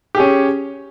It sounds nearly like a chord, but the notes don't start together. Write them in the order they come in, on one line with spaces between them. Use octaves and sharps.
G4 G#4 C#4